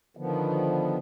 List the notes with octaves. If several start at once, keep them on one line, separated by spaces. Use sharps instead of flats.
D3 D#3 F3 B3